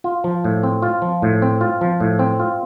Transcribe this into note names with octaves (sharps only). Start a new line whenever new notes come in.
F4
F3
A2
C4
F4
F3
A2
C4
F4
F3
A2
C4
F4